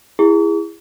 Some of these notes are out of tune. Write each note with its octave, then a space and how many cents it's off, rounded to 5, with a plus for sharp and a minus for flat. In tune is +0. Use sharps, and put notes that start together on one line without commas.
E4 +15 G#4 -20 C#6 +45